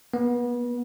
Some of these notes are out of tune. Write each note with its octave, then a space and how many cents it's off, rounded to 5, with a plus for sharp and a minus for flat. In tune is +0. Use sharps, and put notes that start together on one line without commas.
B3 -30